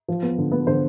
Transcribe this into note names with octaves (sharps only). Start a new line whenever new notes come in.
F3
B3
D3
B3
D3 C5